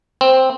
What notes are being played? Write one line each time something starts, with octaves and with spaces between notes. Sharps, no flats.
C4